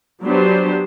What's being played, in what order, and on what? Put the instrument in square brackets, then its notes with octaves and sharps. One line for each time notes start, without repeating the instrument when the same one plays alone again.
[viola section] F#3 B3 D4 G4 C5